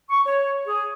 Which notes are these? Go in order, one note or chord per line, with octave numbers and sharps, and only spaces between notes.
C#6
C#5
G#4